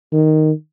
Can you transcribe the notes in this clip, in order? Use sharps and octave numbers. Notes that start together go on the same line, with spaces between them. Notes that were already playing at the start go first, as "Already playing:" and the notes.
D#3